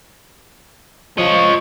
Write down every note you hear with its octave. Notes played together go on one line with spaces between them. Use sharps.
F3 C#5 D#5